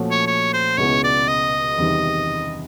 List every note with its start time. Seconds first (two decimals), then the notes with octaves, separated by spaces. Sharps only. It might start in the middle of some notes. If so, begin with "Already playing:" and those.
Already playing: A#2 F3 A3 C#4 F#4
0.11 C#5
0.27 C#5
0.53 C5
0.78 C#2 B2 G#3 B3 E4 C#5
1.04 D5
1.28 D#5
1.78 E2 C3 D#3 G3